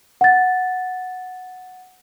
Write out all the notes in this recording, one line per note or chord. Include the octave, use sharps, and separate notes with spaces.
F#5 A6